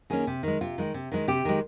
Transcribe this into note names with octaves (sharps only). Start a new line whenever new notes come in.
D#3 A#3 C#4 G#4
C3
D#3 G#3
C3 F4
D#3 G#3
C3
D#3 G#3
C3 G4
D#3 G#3